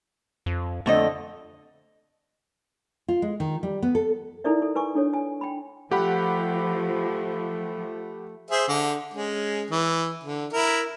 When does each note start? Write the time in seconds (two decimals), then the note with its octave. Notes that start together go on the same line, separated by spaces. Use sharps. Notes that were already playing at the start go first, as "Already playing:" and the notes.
0.46 F2
0.86 F2 D3 A3 D#5
3.08 F4
3.22 G#3
3.40 D#3
3.63 G3
3.82 B3
3.95 A4
4.44 D#4 E4 A4 A#4 D5 E5
4.62 A4
4.75 B4 G#5 C#6
4.95 D4 A4 C#5
5.13 G#5
5.41 G5 B5
5.91 F3 A3 G4 F#5 B5
8.51 G#4 C5 E5
8.68 D3
9.14 G#3 C#4
9.70 E3
10.23 D3
10.53 E4 A#4